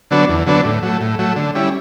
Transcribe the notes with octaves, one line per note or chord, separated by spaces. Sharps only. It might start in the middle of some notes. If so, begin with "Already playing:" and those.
D3 F#3 B3 D4
E2
D3 F#3 B3 D4
A2
F#3 A3
A2
F#3 A3
D3
G3 C#4 E4